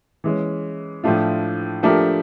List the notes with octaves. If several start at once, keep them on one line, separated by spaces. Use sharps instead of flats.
E3 G#3 C#4
A2 F3 A3 D4 F4
F3 A3 D4 G4 A#4